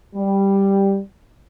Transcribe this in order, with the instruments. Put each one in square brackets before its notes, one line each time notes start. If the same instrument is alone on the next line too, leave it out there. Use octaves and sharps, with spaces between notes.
[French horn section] G3